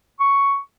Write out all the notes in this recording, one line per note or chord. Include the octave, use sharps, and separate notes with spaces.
C#6